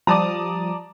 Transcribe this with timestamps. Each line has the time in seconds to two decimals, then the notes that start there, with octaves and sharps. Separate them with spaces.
0.07 F3 G3 D5 A5 A#5 D#6